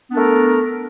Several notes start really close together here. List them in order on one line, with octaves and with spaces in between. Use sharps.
B3 D4 A#4 A3